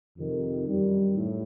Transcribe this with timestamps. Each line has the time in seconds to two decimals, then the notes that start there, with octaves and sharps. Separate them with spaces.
0.16 F2 C3 D#3
0.66 F#2 D#3 G3
1.15 A2